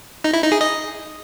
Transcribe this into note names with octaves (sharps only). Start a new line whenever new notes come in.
D#4
E4
D#4
G#4
D#5